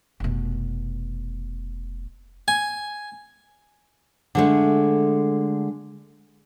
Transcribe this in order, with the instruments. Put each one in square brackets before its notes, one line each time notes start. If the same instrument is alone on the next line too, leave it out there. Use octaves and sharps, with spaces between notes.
[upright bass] F1 B2
[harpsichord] G#5
[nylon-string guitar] D3 G#3 A3